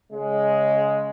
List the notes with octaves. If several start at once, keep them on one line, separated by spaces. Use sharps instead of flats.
C#3 G#3